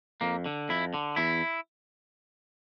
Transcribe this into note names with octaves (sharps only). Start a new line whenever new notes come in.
F2 A#3
D3
F2 E4
D3
E2 E4